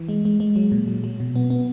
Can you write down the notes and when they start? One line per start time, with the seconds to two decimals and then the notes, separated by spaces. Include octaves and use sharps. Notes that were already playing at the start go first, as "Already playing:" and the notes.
Already playing: E3
0.09 G#3
0.25 G#3
0.40 G#3
0.56 F#3
0.72 A#2
0.88 F#3
1.04 F#3
1.20 B2
1.36 B3
1.50 B3